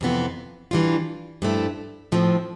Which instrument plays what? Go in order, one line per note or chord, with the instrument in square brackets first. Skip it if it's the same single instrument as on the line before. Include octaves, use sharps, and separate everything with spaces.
[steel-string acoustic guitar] F2 C3 E3 B3 F4
E3 G3 D4 F4
G2 F3 A3 E4
A2 F3 C4